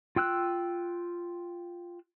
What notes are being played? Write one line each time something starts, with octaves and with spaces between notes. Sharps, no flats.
F4 G5 E6 F#6